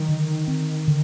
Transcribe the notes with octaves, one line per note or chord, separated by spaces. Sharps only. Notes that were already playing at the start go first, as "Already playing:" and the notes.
Already playing: D#3 F#3
D3
C4
D3